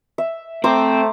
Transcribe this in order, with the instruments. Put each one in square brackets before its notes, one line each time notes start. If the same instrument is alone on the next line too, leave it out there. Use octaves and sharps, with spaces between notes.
[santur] E5
[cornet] A3 [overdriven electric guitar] C4 [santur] C5 A#5 D6